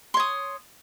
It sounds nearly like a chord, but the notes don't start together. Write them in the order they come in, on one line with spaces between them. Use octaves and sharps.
C6 C#5 D#6